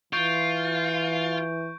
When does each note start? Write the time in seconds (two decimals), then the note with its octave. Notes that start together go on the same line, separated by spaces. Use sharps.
0.13 E3 F4 C#6 G6 D7